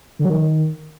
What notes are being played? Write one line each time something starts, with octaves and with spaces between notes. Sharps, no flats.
D3
F#3
D#3